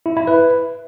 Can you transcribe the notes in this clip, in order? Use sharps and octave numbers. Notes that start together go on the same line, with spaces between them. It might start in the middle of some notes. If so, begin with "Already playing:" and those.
E4
E4
B4